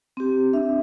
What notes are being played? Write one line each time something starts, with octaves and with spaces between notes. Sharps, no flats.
C4 G4
D4 E5